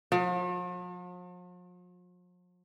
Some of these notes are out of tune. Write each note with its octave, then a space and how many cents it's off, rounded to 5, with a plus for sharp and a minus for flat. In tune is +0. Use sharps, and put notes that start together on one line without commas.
F3 +45